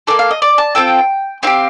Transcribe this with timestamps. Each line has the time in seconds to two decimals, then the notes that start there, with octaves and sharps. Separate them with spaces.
0.07 A#3 D4 A4 D5
0.19 F5
0.31 D#5
0.42 D5
0.58 A5
0.75 C4 F4 A4 G5
1.43 C4 D#4 F5
1.47 G4